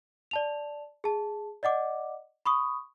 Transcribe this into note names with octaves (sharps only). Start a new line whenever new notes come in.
D5 A5 F7
G#4 A5
D5 D#5 F#5 D6
B5 C#6 D#6